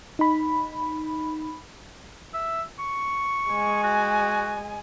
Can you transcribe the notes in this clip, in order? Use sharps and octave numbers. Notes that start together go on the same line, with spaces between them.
D#4 B5
E5
C#6
G#3 G#5
F#4